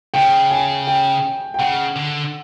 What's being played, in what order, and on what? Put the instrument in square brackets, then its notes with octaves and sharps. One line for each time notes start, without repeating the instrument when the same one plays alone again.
[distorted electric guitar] C#3 [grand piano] G5
[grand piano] G#5
G5
G5
[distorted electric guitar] C#3 [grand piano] F#5
[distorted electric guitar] D3